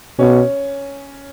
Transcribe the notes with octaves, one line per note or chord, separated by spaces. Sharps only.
B2 C#4